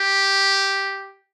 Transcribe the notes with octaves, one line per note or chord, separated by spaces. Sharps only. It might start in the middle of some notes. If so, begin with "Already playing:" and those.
Already playing: G4